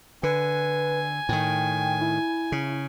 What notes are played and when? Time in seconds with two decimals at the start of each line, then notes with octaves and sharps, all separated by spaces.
0.23 D3 B4 G#5
1.29 A2 D#3 G5
2.01 E4
2.52 C#3